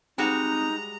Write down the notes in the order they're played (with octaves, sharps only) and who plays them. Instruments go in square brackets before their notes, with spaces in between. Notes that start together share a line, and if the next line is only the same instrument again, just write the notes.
[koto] G3 G#3 F#4 [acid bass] C4 [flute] D#4 [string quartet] A#5